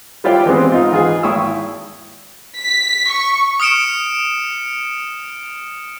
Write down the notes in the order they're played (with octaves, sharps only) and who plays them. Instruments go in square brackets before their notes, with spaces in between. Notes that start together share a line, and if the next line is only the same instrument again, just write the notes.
[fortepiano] G3 E4 F4 G4 D5
E3 G#3 B3 C4
G#2 D#4 F4
E3 F4 G#4
G#1 E4 G5 C#6 D#6 E6
[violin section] B6
C#6
[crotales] D#6 F6 C#7 D7 E7